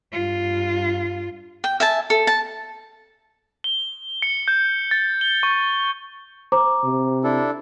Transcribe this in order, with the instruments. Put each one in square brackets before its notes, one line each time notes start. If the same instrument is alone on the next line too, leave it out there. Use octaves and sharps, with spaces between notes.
[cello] G2 F4
[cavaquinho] G5
E5 G#5 A5
A4
A5
[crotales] G7
C#7
G6
A6
G7
C#6
[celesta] C5 A#5 D6
[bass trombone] C3
[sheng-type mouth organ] D4 E4 A4